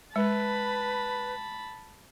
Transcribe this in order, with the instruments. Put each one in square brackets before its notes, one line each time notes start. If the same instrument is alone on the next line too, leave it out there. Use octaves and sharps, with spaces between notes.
[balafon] G#3 [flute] B4 [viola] A5 B5